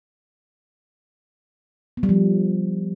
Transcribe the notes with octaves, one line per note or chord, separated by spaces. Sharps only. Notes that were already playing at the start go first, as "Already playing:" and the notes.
B3
G3
F3